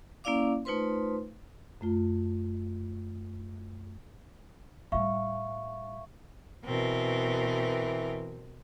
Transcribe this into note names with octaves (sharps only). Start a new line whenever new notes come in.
A#3 C#4 E4 D5 F5 D6
A3 D#4 F4 B4 C5 C6
F#2 A3 F4
A2 G3 E5 F5 C#6
B2 E3 C4 A#4